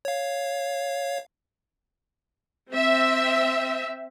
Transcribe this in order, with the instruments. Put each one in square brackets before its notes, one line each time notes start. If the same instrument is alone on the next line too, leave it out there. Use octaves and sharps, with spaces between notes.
[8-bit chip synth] C#5 F5
[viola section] C4 E5